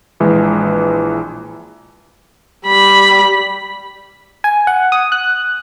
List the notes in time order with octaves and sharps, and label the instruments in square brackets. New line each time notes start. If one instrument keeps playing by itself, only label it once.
[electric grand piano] A#1 E3 G#3
[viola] G3 B5
[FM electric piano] G#5
F#5
D#6
F#6